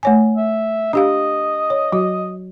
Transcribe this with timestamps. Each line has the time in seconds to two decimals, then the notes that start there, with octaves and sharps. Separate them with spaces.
0.03 A3 C#5 G#5
0.37 E5
0.93 D4 G4 D#5 F5
1.70 C#5
1.92 F#3 F#4